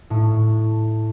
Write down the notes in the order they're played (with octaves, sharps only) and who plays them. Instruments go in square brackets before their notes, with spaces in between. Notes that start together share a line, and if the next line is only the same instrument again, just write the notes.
[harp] A2